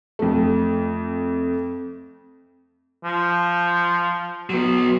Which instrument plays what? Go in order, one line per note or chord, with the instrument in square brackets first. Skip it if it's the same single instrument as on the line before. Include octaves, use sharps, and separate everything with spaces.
[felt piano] F2 A3
[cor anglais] F3
[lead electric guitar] F#3 B3